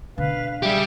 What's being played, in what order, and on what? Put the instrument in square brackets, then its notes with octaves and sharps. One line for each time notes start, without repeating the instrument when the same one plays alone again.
[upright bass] B2 D3 [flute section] B4 F5
[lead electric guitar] G3 G4 [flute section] G#4 E5 B5